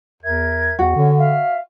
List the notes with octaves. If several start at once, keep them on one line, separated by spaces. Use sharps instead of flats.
E2 A#4 E5 G#6
E2 F#4
D3 C#4
E5 F5